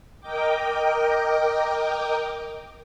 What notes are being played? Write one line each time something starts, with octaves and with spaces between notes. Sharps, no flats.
A#4 D#5 G5 D6